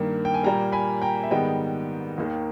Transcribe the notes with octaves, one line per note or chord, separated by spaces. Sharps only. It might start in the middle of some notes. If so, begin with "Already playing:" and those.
Already playing: G2 D#3 A#3
G5
G#5
A#2 G3 A#3 G5 A#5
G#5 B5
G5 A#5
E5
G#2 D#3 G3 B3 D#5 G5
D#2 D#3 A#3